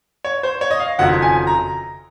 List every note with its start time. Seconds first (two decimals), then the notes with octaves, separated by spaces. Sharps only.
0.25 C#5
0.43 C5
0.61 C#5
0.71 D#5
0.80 F5
0.99 F#1 F2 D#3 F#3 F#5
1.22 G#5
1.47 A#5